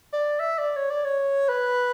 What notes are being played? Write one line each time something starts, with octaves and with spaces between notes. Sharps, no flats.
D5
E5
D5
C#5
D5
C#5
B4